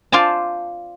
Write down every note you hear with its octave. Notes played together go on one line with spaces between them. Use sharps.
F4 C5 D5 G#5 A5